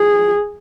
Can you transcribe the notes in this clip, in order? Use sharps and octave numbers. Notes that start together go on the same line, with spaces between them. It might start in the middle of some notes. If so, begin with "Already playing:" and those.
Already playing: G#4